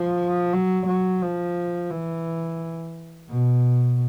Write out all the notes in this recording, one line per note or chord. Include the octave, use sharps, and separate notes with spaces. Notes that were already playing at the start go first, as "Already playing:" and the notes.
Already playing: F3
F#3
F#3
F3
E3
B2